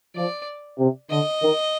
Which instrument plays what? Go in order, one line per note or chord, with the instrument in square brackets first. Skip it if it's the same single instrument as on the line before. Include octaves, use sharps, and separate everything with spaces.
[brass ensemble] F3 [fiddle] D5
[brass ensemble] C3
[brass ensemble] D3 [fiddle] D#5
[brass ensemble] D#3